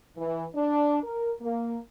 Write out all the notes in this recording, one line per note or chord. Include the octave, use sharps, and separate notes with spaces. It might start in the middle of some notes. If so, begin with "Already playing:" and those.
E3
D4
A#4
A#3